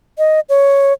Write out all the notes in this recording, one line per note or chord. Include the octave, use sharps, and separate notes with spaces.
D#5
C#5